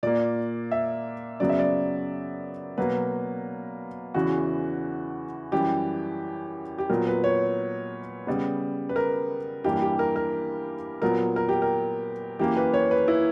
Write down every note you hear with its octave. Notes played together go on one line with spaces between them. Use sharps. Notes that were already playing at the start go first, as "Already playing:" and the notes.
A#2 A#3 D5
E5
F#2 C#3 F#3 B3 D5
E5
D5
B2 F#3 A#3 B4
E2 C#3 E3 F#4
F#2 E3 G3 G4
G4
A#2 F#3 B3 A#4
B4
C#5
C#3 G3 B3
B4
A#4
G2 E3 G3 A#3 G4
G4
A#4
A#4
A#2 F#3 B3 A#4
A#4
G4
A#4
F#2 E3 A#3 G4
B4
C#5
B4
E4